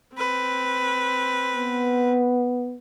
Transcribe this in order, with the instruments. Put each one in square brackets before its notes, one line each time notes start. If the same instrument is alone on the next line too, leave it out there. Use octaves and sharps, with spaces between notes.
[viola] C4 B4
[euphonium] B3